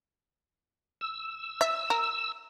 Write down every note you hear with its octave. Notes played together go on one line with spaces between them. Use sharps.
E6
E5
A#4